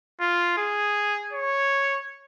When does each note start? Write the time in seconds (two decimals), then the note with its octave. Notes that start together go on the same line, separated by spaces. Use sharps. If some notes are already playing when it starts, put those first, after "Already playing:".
0.21 F4
0.58 G#4
1.33 C#5